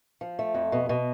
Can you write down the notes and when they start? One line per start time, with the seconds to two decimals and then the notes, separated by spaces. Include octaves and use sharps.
0.21 F3
0.39 A3
0.55 F2
0.72 B2
0.89 B2